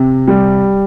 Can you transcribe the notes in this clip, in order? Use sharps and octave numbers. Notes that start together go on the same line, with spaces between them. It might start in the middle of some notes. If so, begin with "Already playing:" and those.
Already playing: C3
G3